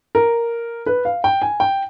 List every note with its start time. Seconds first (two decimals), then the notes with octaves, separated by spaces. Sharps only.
0.15 A#4
0.86 B4
1.05 F5
1.24 G5
1.42 G#5
1.60 G5